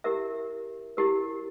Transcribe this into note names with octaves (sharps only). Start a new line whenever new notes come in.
E4 G4 A#4 E5
E4 G4 A#4